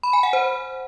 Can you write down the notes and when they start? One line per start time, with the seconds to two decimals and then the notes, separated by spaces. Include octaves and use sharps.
0.03 B5
0.13 G#5
0.23 F#5
0.33 C5